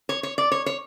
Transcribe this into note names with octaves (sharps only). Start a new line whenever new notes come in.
C#5
C#5
D5
C#5
C#5